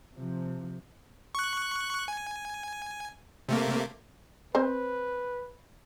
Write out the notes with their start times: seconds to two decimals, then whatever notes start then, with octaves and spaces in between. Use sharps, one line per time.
0.14 C3 F3
1.35 C#6 F#6
2.08 G#5
3.49 C3 A3 A#3
4.55 C4 B4 C5